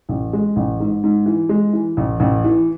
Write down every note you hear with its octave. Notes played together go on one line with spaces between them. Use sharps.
A1
G#3
A1
G#2
G#2
E3
G#3
E3
A1
A1
E3